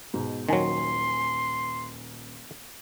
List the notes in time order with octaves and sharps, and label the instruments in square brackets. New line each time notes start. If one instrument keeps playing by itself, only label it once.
[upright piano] G#2 B2
[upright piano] D#1 G#5 [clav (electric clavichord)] D#3 F#3 [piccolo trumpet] C6